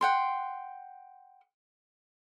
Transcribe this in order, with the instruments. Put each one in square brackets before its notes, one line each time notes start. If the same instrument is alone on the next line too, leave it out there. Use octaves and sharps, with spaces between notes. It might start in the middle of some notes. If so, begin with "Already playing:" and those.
[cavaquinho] F#5 G5 C6